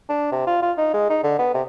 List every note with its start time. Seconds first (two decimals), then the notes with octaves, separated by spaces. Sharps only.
0.09 D4
0.32 C3
0.47 F4
0.62 F4
0.78 D#4
0.94 G#3
1.10 D#4
1.23 D3
1.39 B3
1.54 C3